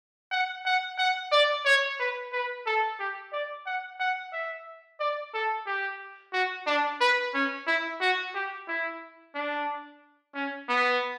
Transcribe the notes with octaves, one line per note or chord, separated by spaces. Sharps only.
F#5
F#5
F#5
D5
C#5
B4
B4
A4
G4
D5
F#5
F#5
E5
D5
A4
G4
F#4
D4
B4
C#4
E4
F#4
G4
E4
D4
C#4
B3